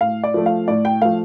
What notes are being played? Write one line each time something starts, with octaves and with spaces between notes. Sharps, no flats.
A2 F5
D5
F3 A3
F5
A2 D5
G5
F3 A3 F5